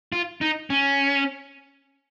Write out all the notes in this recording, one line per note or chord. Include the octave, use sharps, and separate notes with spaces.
F4
D#4
C#4